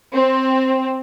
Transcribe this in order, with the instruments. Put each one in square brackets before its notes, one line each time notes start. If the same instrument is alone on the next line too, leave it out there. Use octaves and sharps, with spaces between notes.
[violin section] C4